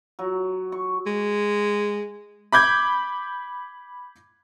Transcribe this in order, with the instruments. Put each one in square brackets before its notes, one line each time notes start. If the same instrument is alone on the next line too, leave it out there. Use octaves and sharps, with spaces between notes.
[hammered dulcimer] F#3
C#6
[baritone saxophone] G#3
[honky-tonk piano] B5 D6 G6 G#6